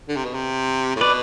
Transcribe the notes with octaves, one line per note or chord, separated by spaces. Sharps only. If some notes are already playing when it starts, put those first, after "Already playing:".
D3
C3
B2
C3
A2
B2 B4 D5